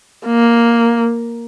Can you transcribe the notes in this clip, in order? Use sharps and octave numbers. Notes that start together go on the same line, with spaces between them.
A#3